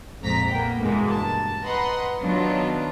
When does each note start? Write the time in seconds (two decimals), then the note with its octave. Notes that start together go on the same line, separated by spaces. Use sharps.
0.22 A#1 F2 G#2 F3 A#5 B6
0.50 A#3 B3 G5
0.81 G2 B2 E3 G#3 A#3
1.10 A5
1.64 B4 D#5 F#5 A#5 C6
2.20 D#3 F#3 B3 D4 D#4 F4